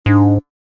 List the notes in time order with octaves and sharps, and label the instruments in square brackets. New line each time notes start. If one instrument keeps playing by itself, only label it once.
[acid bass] G#2 [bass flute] D4